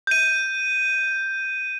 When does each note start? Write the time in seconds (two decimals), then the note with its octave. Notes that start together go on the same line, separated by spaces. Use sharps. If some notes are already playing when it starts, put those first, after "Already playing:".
0.07 G6 D#7